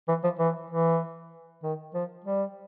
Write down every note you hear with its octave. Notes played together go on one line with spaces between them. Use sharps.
E3
F3
E3
E3
D#3
F3
G3